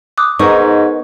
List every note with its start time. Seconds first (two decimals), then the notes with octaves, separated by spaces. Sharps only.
0.18 D6 D#6 F#6
0.39 G#2 B3 D#4 A#4 C#6